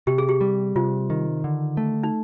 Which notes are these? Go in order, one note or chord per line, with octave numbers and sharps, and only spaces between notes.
C3 G4
G#4
G4
G3
C3 F4
D#3
D3
A3
D#4